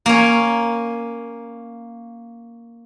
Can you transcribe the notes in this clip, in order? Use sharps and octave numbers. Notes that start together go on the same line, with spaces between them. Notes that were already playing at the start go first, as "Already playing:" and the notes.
A#3 C#4